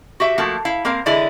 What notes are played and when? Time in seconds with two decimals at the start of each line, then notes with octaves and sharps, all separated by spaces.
0.20 F#4 G4 E5
0.38 F3 A3 A#3 F#4
0.65 E4 F5
0.85 A#3 C4 A#4 F5
1.06 D3 E3 G#3 E4 D5